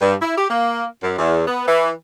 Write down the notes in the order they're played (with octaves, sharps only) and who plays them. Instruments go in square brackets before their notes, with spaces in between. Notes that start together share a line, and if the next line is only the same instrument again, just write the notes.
[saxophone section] G2
E4
G4
A#3
F#2
E2
B3
E3